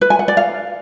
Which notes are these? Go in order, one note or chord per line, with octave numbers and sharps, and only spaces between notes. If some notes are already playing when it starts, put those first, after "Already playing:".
B4
G#5
F#5
D5
F5